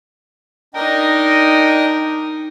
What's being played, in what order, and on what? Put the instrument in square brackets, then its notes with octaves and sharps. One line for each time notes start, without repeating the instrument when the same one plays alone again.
[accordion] D4 D#5 G5 [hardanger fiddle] D#4 A#4